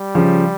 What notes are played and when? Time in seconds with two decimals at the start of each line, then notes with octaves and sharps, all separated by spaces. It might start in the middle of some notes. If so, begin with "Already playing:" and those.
Already playing: G3
0.15 C#3 F3